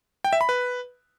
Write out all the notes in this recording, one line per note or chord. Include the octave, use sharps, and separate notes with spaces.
G5
E5
B5
B4